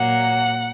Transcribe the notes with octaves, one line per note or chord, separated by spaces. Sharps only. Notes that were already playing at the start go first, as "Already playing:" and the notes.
Already playing: A#2 F#3 A#3 F#5